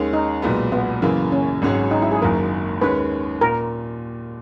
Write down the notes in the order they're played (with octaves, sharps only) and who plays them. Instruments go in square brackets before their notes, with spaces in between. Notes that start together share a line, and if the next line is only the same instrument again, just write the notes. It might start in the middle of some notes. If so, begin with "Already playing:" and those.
Already playing: [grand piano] D#2 D#3 G#3 C#4 G#4
[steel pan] D#4
[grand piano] B1 A#2 G#3 B3
[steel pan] B3
[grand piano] F#2 C#3 E3 A#3
[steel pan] C#4
[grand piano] G#1 G#2 F#3 C#4 G#4
[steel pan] D#4
E4
G#4
[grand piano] F#1 F#2 D#3 A#3 [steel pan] A#4
[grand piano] D#2 D#3 G#3 C#4 [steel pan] B4
[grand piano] A#2 [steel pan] A#4